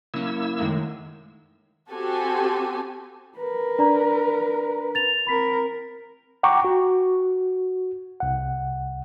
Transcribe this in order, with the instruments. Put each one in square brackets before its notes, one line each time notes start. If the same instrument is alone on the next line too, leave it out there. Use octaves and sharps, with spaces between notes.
[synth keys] C#3 F#3 C#4 [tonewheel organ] A#3 E4 E6
[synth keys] F#2 C3 G#3 [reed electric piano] D#3 A3
[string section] C4 F#4 G4 A4 G#5
[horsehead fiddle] A#4 B4
[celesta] D4 D5 A#5
A6 F7
[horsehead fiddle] C4 A#4 [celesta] B5 B6
[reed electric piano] F#5 G5 A#5 C#6 D6
F#4
C2 F#5